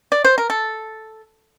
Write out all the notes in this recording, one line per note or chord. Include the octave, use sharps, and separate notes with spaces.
D5
C5
A#4
A4